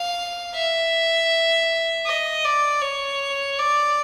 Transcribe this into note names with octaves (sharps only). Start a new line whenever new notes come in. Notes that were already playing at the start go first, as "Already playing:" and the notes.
Already playing: F5
E5
D#5
D5
C#5
D5